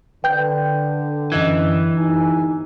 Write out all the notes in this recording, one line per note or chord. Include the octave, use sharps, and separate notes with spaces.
D3 B4 G5 G6
F#2 E3 D#5 G#6
G1 D#4 G#5